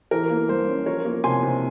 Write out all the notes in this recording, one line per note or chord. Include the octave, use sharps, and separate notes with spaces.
E3 A#4
A#3
G2 C5
C#4
F3 A#4 C#5
A#3
C3 G#5 C6
C3